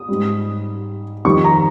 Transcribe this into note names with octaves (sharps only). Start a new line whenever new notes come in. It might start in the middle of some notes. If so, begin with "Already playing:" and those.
Already playing: D#6
G#2 G3
F2 D#3 G3 C#6
A#5